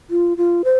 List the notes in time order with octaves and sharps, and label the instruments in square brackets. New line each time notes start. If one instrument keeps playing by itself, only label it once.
[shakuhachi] F4
F4
C5